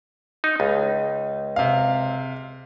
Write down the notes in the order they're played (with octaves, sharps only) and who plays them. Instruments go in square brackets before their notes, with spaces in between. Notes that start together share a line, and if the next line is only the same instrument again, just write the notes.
[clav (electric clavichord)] D#4
C#2
[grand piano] C3 F5